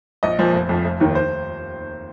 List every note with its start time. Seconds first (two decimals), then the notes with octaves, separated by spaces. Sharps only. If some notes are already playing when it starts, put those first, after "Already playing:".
0.23 A#1 D#5
0.39 A#2 F3 C5
0.53 F1
0.69 F2 F3
0.84 F1
1.00 D#2 D#3
1.15 C5